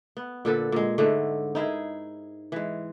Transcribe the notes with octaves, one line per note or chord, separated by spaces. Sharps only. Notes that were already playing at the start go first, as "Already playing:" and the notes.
B3
A#2 D3 A4 B4
A#2 G#3
G#2 D3 G#3 A3
D#4 E4 G#4 A#4
E3 G#3